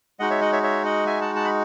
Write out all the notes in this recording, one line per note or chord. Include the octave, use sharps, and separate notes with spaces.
G#3 D#4 F#4 D#5 F#5
C#5 E5
D#5 F#5
C#5 E5
C#5 E5
D#5 F#5
E5 G#5
F#5 A5
F#5 A5
B5